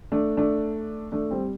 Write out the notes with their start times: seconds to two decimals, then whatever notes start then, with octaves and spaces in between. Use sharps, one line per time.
0.12 A3 D4
0.37 A3 D4
1.12 A3 D4
1.31 G3 C4